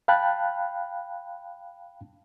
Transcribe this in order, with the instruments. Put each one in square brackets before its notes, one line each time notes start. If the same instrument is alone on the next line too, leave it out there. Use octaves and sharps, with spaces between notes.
[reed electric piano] F5 G5 A5 B5 F#6